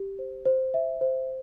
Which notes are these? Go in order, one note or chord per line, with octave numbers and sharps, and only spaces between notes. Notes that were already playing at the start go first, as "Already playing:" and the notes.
Already playing: G4
C5
C5
E5
C5